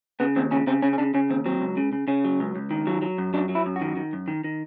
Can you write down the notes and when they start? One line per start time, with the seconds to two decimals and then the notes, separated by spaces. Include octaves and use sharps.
0.20 C#3 B3
0.36 D#2 C4
0.51 C#3 C#4
0.67 C#3 C4
0.82 C#3 C#4
0.93 C#4
0.98 C#3 D4
1.14 C#3 C#4
1.30 D#2 C4
1.46 F#3 C4
1.61 C#2
1.77 C#3
1.93 C#3
2.08 C#3 C#4
2.25 F#3
2.40 C#2
2.56 C#2
2.71 D#3
2.87 F#3
3.02 F#3
3.18 F#2
3.34 F#3 D4
3.49 F#3
3.55 E4
3.66 F#2
3.76 F#4
3.81 D#3
3.96 D#3
4.13 F#2
4.28 D#3
4.44 D#3